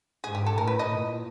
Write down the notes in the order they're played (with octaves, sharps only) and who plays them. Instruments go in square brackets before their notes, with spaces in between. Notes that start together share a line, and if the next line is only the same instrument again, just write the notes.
[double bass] G#2 [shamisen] G#4
[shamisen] G4
A4
[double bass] A2 [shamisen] A#4
[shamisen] B4
D#5
[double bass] A#2